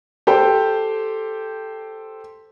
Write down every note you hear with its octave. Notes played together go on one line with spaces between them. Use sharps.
G4 A4 C5 G5